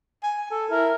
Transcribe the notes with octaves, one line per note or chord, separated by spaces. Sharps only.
G#5
A4
E4 A#4